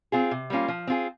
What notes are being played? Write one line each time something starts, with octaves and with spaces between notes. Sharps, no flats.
C4 F4 G#4
C3
G3 A#3 C#4 F4
F3
C4 F4 G#4